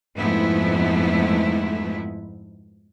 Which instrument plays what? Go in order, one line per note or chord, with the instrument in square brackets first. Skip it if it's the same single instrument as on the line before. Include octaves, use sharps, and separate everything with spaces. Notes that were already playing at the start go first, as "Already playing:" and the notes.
[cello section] F2 G#2 F3 A3 B3 E4